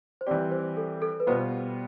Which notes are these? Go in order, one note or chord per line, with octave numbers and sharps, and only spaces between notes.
C5
E3 G3 C4 G4 D5
C5
A4
A4
B4
B2 G3 B3 F4 C5